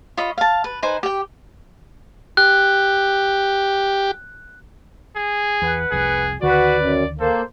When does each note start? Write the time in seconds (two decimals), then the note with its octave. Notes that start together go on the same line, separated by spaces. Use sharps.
0.17 F4 C#5 D#5 B5
0.38 F5 A5
0.64 B4
0.82 D#4 B4 C5 G#5
1.03 G4 G5
2.37 G4 F#6
5.16 G#4
5.62 E2 B4 F#5
5.92 F1 C2 G#4
6.42 D2 D3 D#3 F#4 B4 D5
6.79 F#2
7.19 A#3 A4 C5